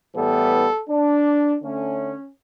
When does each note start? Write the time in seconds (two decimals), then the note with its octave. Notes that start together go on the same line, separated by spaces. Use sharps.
0.15 A2 E3 G3 B3 A4
0.89 D4
1.63 D3 A3 C#4